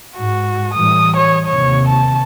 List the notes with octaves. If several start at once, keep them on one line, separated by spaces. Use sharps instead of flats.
G#2 F#4
A2 E3 G3 D#6
C#5
D#2 C3 C#5
A5